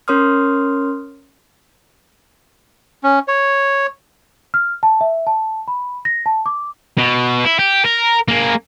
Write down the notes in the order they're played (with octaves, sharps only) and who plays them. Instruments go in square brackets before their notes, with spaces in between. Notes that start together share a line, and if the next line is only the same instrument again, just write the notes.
[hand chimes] C#4 A#4 C#5 C6 D#6 F6
[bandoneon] C#4
C#5
[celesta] F6
A5
E5
A5
B5
A#6
A5
D6
[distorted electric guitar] B2
E4
G4
A#4
A#3 G#4